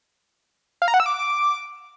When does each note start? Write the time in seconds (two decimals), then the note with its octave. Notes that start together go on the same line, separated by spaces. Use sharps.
0.82 F5
0.88 A#5
0.94 F#5
1.00 E6
1.06 D6